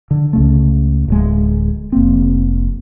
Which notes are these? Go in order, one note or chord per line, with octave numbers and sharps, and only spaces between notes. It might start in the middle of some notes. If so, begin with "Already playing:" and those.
D3
C#2 C#3 A3
D1 G#3
F1 A#3 C4